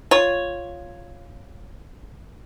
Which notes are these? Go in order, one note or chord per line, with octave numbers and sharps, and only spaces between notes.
F4 C#5